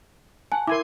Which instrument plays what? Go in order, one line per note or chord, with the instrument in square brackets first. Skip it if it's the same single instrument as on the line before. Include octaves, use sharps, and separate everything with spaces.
[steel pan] F#5 [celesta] G#5 A5
[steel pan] E4 G#5 C6 [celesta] A#4 D6